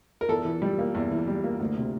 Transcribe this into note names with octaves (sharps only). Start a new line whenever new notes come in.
A#4
E2 A4
E3
G3
A#3
E2
E3
G3
A#3
D2
C3